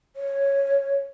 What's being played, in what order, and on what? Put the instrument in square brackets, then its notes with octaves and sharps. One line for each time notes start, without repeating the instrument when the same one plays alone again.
[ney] C#5